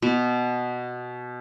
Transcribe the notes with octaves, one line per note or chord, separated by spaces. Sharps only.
B2